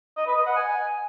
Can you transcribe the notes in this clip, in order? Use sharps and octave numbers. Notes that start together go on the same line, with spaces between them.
D#5
B4
D#5
F#5
G#5